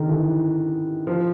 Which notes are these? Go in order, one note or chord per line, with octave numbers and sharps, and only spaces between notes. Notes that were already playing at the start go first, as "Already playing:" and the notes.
Already playing: D3 D#3
E3
F3